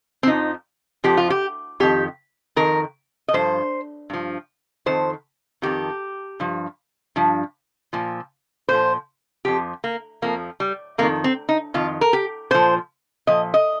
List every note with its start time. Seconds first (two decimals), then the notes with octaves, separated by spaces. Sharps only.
0.23 C4
0.27 F2 F3 D#4
1.04 F2 F3 G4
1.17 F4
1.30 G4
1.80 F2 D#3 G4
2.56 F2 D#3 A#4
3.28 D#5
3.33 G2 F3 C5
4.10 G2 F3
4.86 F2 D#3 C5
5.62 F2 D#3 G4
6.40 G2 F3
7.16 G2 F3
7.93 A#2 F3
8.69 A#2 F3 C5
9.45 F2 F3 G4
9.84 A#3
10.22 F2 F3 A#3
10.60 G3
10.98 F2 A#3
11.02 D#3
11.24 C4
11.49 D#4
11.74 F2 D#3 F4
12.01 A#4
12.13 G4
12.51 A#2 F3 C5
13.27 A#2 F3 D#5
13.54 D#5